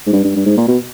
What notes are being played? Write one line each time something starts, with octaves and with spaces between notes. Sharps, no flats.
G#2
G2
G2
G2
G#2
A#2
B2